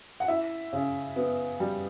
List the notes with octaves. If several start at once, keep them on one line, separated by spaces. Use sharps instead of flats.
F#5
E4 E5
C#3
B3
G3